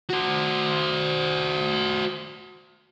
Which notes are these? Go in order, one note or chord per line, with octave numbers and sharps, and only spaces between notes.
F#4 C5